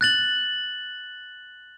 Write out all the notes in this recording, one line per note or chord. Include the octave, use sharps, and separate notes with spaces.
F#6 A6 F#7